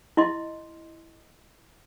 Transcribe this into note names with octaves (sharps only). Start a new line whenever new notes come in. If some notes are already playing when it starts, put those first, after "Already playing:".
E4 D#5 C6